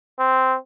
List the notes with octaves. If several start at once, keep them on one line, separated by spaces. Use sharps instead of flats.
C4